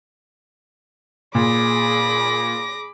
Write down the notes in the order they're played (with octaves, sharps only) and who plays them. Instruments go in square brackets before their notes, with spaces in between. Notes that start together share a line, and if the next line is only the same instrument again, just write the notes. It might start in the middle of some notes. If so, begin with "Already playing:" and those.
[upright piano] A#2 [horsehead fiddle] G#4 B5 [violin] D6 A#6